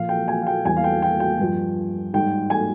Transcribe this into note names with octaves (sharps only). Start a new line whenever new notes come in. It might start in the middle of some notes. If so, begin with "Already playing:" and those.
Already playing: A#2 F3 F5
G5
G#5
F5
G5
E2 E3 G3 G#5
F5
G5
G5
G5
G2 F3
G#2 G3 G5
G#5